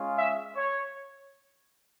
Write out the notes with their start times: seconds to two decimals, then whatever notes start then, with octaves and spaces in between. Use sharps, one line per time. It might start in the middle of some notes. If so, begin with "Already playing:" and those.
Already playing: G#3 C#4 F4
0.18 E5
0.56 C#5